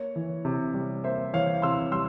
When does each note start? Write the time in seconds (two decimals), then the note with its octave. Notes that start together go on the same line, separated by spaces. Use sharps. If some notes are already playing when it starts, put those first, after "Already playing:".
Already playing: A#3 C#5
0.16 E3
0.45 C3
0.74 G3
1.04 A#3 C5 E5
1.33 E3 C#5 F5
1.62 C3 C6 E6
1.92 G3 C6 E6